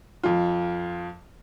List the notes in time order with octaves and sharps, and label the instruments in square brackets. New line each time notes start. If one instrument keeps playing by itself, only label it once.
[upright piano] F2 F4